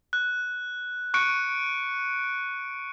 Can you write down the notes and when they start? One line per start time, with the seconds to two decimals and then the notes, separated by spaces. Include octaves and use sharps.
0.13 F#6
1.14 C#6 F#6 C#7 D7